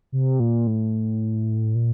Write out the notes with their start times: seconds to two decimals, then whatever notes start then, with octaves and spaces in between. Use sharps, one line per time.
0.12 C3
0.40 A#2
0.67 A2
1.75 A#2